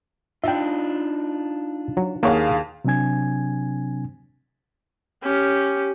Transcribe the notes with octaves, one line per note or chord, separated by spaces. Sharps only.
D4 D#4 F4 E5 G5
F#3
D#2 A#3 G#4 C#5 F5 F#5
C3 F#3 C4 D4 G#5 G#6
C#4 G4